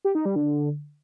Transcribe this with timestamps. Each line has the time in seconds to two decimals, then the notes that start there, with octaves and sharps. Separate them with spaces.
0.05 G4
0.15 D#4
0.25 G3
0.36 D3